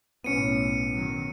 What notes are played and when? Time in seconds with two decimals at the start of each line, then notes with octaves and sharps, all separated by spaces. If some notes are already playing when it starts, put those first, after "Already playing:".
0.24 B1 A2 B3 C#4 C#7 D#7
0.94 D#3 F#3